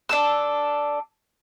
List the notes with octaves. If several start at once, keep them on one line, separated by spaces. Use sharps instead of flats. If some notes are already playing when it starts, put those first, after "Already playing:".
D4 A4 E6